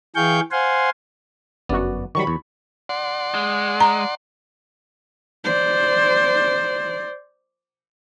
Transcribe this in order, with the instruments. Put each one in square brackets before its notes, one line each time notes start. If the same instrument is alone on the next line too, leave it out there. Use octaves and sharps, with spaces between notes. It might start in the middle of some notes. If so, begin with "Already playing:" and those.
[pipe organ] E3 G#4 F5 G5 C#6 G6
C5 F5 F#5 G#5 C6
[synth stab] G1 F#2 F#4 [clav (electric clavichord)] B3 D5
[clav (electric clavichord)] D#3 F#3 G3 [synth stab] B5 C#6
[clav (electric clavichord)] E2
[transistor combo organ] D5 F#5 C6
[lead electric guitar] G#3
[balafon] A#5
[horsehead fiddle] C5 D5